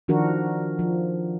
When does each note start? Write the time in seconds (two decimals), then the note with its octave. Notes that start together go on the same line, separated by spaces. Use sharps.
0.08 D#3 F3 D4 F#4 A#4
0.79 F3